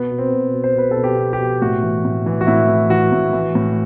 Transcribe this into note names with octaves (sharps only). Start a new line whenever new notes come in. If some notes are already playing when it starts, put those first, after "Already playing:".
Already playing: B2 B3
B2
C4
B2
B2
C5
B2 B4
A4
B2
G4
B2
G4
B2
A2 F#4
E3
A2
E3
F#4
A2 E4
E3
E3 F#4
A2
E3
A2